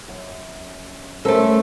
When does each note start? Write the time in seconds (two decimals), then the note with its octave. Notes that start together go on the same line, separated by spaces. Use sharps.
0.08 F#2
1.25 A3 C#4 A4 A#4 C5